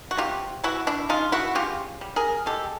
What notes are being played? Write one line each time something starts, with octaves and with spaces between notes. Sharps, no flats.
F#4
C3 F4 G4
E3 E4 F#4
D4 E4
C#3 D#4 F4
E4 F#4
C#3 F4 G4
G3
G#4 A#4
G#3 G4 A4